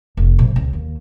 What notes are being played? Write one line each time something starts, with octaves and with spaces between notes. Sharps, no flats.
F1
A#1
C#2
D#2